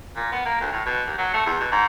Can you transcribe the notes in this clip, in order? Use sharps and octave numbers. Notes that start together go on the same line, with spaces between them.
A#2
B3
A#3
D2
A2
B2
D#2
F#3
A3
E2
B2
G#2